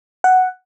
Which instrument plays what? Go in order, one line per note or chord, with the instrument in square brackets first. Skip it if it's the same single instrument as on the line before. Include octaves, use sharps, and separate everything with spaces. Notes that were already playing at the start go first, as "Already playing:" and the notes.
[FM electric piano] F#5